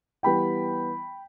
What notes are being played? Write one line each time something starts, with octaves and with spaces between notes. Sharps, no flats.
E3 G3 B3 G5 B5